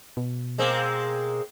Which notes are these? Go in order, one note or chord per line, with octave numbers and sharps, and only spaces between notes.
B2
G#3 A#3 C4